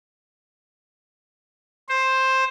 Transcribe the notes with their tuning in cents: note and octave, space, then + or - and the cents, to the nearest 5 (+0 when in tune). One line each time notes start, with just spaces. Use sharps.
C5 +10